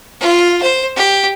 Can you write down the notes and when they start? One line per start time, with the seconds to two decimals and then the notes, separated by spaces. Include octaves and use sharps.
0.21 F4
0.62 C5
0.96 G4